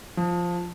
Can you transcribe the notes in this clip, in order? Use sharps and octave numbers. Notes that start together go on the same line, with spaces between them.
F3